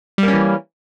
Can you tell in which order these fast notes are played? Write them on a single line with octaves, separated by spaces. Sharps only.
G3 A#3 C#4 E3